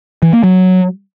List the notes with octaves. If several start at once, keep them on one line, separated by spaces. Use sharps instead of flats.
E3
A#3
F#3